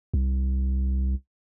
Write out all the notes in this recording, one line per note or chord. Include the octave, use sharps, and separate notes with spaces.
C2